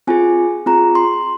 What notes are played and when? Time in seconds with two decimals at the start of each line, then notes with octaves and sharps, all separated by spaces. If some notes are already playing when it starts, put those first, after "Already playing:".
0.07 C4 F4 G#4 G#5
0.66 C4 F4 G#4 A#5
0.95 C6